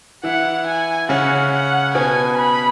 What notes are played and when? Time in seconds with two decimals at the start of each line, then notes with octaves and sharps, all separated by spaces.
0.24 E3 E4 F#5
0.67 G#5
1.09 C#3 C#4 F#5
1.52 F#5
1.95 B2 B3 G#5
2.37 B5